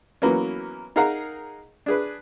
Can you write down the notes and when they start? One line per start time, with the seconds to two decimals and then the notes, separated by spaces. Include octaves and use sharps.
0.22 E3 F#3 A#3 B3 C#4
0.96 D#4 G#4 A#4 F5 F#5 A#5
1.86 D4 G#4 B4